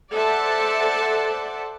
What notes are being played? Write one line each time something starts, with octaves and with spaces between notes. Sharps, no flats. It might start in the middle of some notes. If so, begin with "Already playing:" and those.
A4 C5 D5 E5 F#5 A5